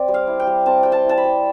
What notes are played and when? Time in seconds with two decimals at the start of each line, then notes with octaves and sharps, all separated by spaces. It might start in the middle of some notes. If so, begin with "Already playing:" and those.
Already playing: C4 D5
0.08 G3
0.14 F5
0.27 E4
0.40 G5
0.47 G3
0.66 C4 A5
0.83 G3 G5
0.92 A5
1.05 E4 A5
1.18 B5
1.24 G3